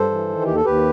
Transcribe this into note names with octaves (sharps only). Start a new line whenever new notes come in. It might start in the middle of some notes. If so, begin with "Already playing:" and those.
Already playing: G2 A4 C5
E3
D#3
D#2 G4
A4
D#2 G4 B4